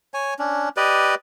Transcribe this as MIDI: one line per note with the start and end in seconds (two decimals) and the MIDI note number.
0.14 0.34 73
0.14 0.34 80
0.39 0.69 61
0.39 0.69 62
0.77 1.15 67
0.77 1.15 71
0.77 1.15 74
0.77 1.15 75